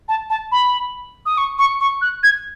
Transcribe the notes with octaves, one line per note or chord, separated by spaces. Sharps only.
A5
A5
B5
D#6
C#6
C#6
C#6
F#6
G#6